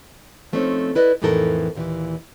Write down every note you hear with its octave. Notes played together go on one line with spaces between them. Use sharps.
F3 A3 C4 C#4 D#4 C#5
E4 B4 D5 D#5
F2 A2 E3 D#4 A4 A#4
D#2 A#2 D#3 E3